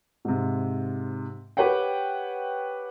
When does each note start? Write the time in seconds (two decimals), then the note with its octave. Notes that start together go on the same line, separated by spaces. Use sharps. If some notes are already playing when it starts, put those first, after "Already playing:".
0.25 G#2 C3
1.57 G4 B4 C#5 F#5 G5